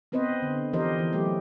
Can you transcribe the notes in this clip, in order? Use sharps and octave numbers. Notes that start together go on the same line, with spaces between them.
B3 C4 B4 C5 D#5
D3
E3 F3 G4 A#4 C5 D#5
E3
F#3 A3 G4